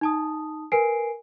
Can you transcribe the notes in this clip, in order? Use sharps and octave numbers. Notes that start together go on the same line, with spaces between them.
D#4 A5 D#6
A#4 B4 G#5 C7 D7